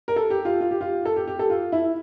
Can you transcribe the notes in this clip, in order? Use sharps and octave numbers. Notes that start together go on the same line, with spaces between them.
A#4
A4
G4
F4
F4
G4
F4
A4
G4
G4
A4
F4
E4